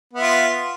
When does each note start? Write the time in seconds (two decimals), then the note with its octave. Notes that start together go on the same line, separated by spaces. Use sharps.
0.13 B3
0.17 E5
0.21 F4